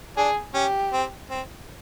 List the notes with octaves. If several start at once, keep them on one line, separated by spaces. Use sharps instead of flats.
D4 G#4
C#4 G4
C4
C4